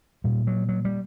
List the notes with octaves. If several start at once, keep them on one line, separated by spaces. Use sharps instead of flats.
A#2 G3
F#3
F#3
G3